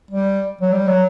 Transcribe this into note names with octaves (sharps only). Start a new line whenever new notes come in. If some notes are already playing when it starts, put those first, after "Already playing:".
G3
F#3
G3
F#3